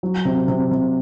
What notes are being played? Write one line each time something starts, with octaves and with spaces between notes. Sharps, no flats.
F#3
C3
C3
C3